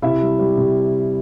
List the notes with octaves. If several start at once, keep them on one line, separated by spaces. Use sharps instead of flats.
C3 E4 E5
G3
G3
C3